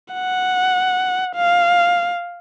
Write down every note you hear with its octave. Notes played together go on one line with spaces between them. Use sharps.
F#5
F5